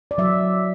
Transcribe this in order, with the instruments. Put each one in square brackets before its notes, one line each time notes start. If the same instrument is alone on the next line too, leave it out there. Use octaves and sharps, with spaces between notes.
[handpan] D5
F#3 E5